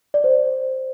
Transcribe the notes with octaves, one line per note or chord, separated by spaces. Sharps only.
D5
C5